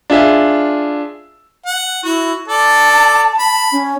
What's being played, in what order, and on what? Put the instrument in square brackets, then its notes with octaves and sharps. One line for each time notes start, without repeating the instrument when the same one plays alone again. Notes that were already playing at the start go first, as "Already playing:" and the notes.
[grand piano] D4 F4 G#4 E5 F5
[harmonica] F#5
[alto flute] E4 [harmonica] F#4
[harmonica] A4 D5 [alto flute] A5
[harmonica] B5
[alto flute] C#4